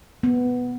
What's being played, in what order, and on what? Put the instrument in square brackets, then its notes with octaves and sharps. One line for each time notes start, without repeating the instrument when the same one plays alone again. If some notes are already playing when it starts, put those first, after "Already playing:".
[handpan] B3